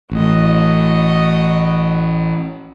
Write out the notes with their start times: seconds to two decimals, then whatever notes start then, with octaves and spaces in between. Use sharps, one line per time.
0.11 A1 F#4 D#5